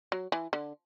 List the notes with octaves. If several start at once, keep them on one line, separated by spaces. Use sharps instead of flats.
F#3
E3
D3